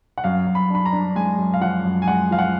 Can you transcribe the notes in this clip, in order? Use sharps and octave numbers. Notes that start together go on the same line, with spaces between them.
F#5
F#2 F5
F#2
B5
D4 B5
A#5
D4
G#3 G#5
F#2
F5
F3 F#5
F#2
G#5
G#3 F#5
F3 F5
F#5